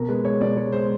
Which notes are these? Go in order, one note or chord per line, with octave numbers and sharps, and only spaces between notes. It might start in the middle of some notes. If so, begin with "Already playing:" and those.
Already playing: B2 A#4
G#3 B4
G#3 C#5
B2 D5
G#3 C#5
G#3 C5